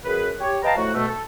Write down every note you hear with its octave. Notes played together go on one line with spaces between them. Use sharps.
F#2 G#4 B4
G4 C#5
B4 D#5 F5 G5 A5 A#5
A2 F3 A3 F#4
B2 A3
A4